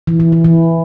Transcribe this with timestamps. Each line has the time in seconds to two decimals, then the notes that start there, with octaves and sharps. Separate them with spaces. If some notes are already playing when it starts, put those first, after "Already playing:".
0.07 E3
0.20 E3
0.32 E3
0.44 E3